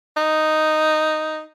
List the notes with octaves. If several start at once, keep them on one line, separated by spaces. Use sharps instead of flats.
D#4